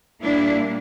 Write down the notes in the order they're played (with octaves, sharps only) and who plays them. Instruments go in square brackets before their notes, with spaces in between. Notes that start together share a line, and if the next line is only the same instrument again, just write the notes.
[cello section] A#2 G3 A#3 D4 E4